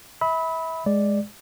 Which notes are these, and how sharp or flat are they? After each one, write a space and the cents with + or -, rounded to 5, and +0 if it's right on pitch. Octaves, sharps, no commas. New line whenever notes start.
E5 -25 B5 +0 E6 -45
G#3 +0 D5 +0